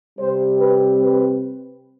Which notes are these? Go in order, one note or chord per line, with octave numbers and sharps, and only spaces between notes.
C3 G3 C4 C5
B4
B4